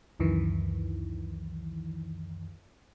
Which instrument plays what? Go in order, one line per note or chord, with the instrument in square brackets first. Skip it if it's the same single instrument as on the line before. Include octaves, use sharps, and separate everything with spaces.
[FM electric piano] C#2 F#2 D#3 E3